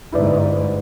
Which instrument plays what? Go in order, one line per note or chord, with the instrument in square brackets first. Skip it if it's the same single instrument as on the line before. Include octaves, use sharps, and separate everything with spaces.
[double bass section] G1 G#2 [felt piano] E4 B4 D5